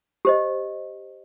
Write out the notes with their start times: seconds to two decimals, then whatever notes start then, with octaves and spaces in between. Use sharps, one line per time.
0.25 G4 C5 D#5